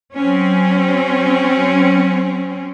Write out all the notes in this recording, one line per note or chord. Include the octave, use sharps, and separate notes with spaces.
F#3 C4 C#4